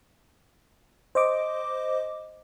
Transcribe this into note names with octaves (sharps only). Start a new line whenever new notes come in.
C5 D#5 D6